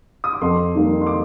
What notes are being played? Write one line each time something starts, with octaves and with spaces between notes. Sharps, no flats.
D#6
D6
F2 C6
D#3 G3 A#3
C6
D6